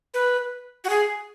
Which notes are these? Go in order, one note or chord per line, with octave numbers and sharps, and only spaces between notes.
B4
F#4
G#4